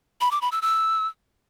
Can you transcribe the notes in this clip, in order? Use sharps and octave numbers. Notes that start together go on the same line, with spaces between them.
B5
D6
B5
E6
E6